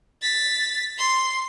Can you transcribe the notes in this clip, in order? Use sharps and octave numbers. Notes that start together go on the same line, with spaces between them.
A6 B6
C6